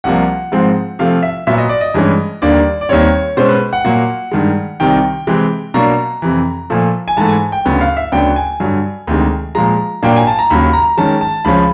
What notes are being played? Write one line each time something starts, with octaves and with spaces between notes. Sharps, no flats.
C2 C3 F3 A#3 F#5
G#2 F3 G#3 C4
C3 F3 A3 F5
E5
A#2 F#3 B3 E5
D#5
D5
D#5
G2 E3 G#3 C#4
D#2 D3 G3 A#3 D4 D5
D5
D#2 D#3 G3 C4 C#5
B2 G#3 C#4 C5
B4
F#5
A#2 F#3 A#3
G2 D#3 G#3
C2 C3 D#3 G5
C3 E3 G#3 C4
B2 F#3 A#3 D4 A#5
F2 C3 E3
A#2 F3 A3
G#5
G#2 E3 A3 A5
G#5
G5
D2 C#3 F#3 B3
F5
E5
D2 C#3 F#3 B3 D4 G5
G#5
G2 D3 F#3
D2 C3 D#3 G#3
A#2 F3 G#3 A#5
A#2 F#3 A#3 D4 G5
G#5
A5
A#5
D#2 C#3 F#3 B5
A#5
F#2 D#3 G#3 C#4 A5
A5
C#2 C#3 F3 G#3 C#4 B5